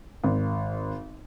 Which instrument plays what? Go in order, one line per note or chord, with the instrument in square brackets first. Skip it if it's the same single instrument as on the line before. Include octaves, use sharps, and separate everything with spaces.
[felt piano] G#1